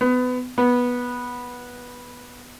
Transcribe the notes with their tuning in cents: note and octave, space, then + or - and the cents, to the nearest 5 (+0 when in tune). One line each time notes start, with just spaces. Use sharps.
B3 +25
B3 -10